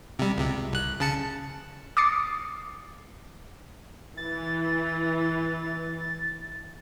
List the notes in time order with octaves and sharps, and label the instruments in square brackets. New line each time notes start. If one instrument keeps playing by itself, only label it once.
[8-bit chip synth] C3 G3
C#2 C3
C2 F#6
C#3 A5 C#7
[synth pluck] D6 D#6 A6 C7 C#7
[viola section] E3 [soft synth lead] A6